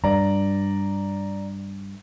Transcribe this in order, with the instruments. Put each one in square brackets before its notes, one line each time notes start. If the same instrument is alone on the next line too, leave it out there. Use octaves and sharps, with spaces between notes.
[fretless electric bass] G2 [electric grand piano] D5 A#5